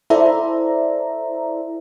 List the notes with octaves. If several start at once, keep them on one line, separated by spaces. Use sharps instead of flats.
E4 A4 C5 D5 E5 A#5